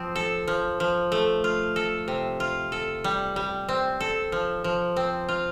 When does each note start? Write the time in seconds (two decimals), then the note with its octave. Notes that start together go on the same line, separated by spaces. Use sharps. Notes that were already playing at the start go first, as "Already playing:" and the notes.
Already playing: F3 C4
0.15 A4
0.48 F3
0.80 F3
1.12 A3
1.44 F4
1.76 A4
2.08 C3
2.40 F4
2.72 A4
3.04 G3
3.36 G3
3.69 C4
4.00 A4
4.32 F3
4.64 F3
4.96 C4
5.29 F4